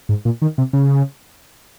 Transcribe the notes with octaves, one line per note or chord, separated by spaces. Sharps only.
G#2
A#2
D#3
C3
C#3